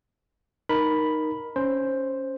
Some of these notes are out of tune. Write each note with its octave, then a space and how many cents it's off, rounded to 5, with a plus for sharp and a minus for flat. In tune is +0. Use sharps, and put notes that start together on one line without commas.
D#4 -5 A#4 +10 B5 +0
C#4 +0 C5 +5